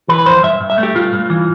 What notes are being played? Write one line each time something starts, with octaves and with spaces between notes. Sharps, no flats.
E3 B4
F2 C5
G2 E5
G2
E5
A3
G4
G2 F4
G2
E3